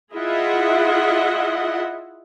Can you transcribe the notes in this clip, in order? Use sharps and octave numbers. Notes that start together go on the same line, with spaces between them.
E4 F4 G#4 D#5 E5 F#5